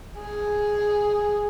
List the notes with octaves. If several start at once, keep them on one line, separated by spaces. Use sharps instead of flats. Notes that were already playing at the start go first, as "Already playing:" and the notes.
G#4